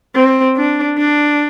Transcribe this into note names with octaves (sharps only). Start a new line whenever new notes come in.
C4
D4
D4